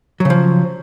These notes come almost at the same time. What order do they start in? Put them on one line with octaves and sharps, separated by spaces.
F#3 C#3 F3